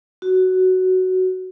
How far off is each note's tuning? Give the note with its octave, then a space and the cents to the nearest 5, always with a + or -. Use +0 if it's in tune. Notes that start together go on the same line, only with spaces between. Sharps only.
F#4 +10